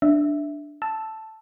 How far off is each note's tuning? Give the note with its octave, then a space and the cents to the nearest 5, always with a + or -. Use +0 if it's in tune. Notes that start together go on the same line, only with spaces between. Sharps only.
D4 +0 E5 -5
A5 +0 E6 +0